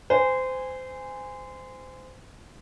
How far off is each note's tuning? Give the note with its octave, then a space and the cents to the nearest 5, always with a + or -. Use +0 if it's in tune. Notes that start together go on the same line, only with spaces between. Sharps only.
C5 -25 G#5 -20